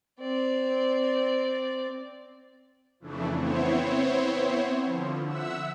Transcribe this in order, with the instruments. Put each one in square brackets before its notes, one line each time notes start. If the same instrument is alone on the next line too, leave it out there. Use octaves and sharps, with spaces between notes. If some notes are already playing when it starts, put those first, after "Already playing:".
[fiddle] C4 D5
[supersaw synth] F2 C#3 E3 A3 D4
B3 C4 E4 C5 C#5
D3 F3
E5 F#5 E6